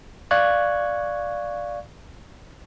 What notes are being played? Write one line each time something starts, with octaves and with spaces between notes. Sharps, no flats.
D5 F5 C#6 F#6 G#6